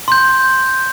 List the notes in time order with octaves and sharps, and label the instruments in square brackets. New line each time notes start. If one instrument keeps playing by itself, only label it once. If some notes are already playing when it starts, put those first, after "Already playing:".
[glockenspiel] C6 G6